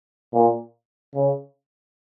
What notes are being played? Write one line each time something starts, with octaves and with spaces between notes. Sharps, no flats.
A#2
C#3